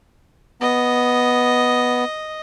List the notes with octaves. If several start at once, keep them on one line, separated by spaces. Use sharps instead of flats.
B3 D#5